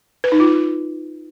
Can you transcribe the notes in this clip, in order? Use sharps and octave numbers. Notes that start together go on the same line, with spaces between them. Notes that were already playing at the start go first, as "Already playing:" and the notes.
B4
D#4
F4